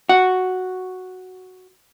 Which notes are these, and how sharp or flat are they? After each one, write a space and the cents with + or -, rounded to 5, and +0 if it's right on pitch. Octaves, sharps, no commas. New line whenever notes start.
F#4 +0 F#5 +0